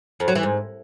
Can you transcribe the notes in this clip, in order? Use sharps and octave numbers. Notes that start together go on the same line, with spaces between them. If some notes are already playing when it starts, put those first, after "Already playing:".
F2
F#3
E3
G#2